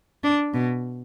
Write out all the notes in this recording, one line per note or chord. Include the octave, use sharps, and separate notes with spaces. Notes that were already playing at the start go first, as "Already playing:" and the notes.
D4
B2